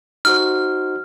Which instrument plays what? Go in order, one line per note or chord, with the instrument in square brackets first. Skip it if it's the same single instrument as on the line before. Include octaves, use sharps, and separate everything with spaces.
[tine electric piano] D#4 F#4 C5 [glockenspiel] F6